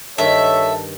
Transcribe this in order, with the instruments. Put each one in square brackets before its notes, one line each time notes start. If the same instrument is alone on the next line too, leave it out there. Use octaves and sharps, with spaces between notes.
[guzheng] G2 D#3 [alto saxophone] A4 [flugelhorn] C#5 [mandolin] E5